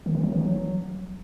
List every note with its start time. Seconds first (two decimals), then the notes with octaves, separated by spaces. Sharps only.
0.06 D#3
0.15 E3
0.23 F#3
0.32 E3
0.41 F#3